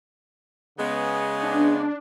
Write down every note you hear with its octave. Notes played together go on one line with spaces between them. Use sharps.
C#3 G#3 B3
D4